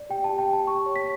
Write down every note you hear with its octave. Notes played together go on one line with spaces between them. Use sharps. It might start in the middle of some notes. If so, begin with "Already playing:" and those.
Already playing: D5
G4 G5
A5
G4
G5
G4
A5
G4 C#6
C#5
B6